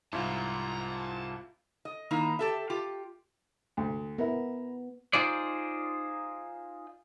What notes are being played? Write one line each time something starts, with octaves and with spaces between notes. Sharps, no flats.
C2 G#2 E4 F4 A5 A#5
D#5
D#3 A#3 D#4 E4
G4 A4 E5
F4 G4 G5
D2
B3 E4 A#4
D#4 F4 G#4 C5 D5